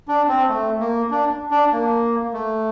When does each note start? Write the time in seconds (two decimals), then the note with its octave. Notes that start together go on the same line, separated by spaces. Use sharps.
0.08 D4
0.28 C4
0.49 A3
0.80 A#3
1.11 D4
1.51 D4
1.72 A#3
2.33 A3